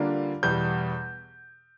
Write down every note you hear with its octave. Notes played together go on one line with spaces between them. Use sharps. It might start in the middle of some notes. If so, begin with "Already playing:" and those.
Already playing: D3 G3 A#3 D4 F4
E2 B2 G3 G6